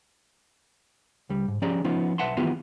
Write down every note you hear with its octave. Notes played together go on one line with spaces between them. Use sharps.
C#2 G3
G#2
F3 C#4 G4 G#4 D5 A#5
F3 B3 C#4 D#4 F4
B1 B4 E5 F#5 A5 C6
D#3 E3 B3 F4 G4 G#4